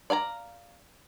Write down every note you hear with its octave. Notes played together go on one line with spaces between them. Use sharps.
D5 F5 G#5 A#5